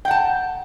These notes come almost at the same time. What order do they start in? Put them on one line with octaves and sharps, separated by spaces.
G5 F#5 A5